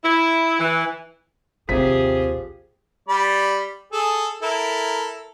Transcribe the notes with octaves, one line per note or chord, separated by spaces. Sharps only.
E4
E3
A#1 D#2 C3 F3 G4 G#4 B6
G3 D5 B5
G#4 A4
E4 A4 A#4